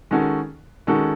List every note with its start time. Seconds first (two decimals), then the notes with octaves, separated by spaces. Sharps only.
0.11 D#3 G#3 C#4 F#4 A4
0.87 D#3 G#3 C#4 F#4 A4